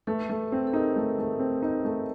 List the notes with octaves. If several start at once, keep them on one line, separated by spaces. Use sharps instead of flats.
A3 A4 B4
A3
C4
A4
D#4 G#4 A#4
A3
A3
C4
D#4
A3